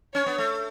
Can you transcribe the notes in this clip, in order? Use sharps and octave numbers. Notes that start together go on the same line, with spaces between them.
C#4 C#5
B3
A3